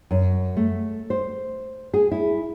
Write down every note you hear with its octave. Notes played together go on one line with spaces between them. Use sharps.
F#2
A3
C5
G#4
E4